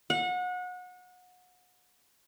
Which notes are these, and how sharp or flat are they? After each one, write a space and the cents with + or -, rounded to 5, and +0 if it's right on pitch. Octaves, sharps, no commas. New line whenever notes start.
F#5 -30